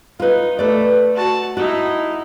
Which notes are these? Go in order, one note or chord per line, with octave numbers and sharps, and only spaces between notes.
D#4 F4 B4
A3 B4 D5
F#4 A5
D#4 E4 F#4